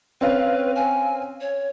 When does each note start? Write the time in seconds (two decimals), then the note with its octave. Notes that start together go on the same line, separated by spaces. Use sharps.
0.21 C4 C#4 B4 F5
0.76 G#5
1.41 C#5